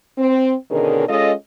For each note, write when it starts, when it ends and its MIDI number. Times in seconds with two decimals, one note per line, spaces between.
0.18 0.55 60
0.71 1.07 47
0.71 1.07 50
0.71 1.07 51
0.71 1.07 61
0.71 1.07 68
0.71 1.07 70
1.08 1.33 56
1.08 1.33 61
1.08 1.33 65
1.08 1.33 69
1.08 1.33 75